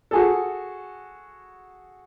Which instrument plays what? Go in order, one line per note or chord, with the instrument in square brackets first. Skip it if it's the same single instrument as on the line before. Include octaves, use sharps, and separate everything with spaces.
[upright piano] F#4 G#4 A4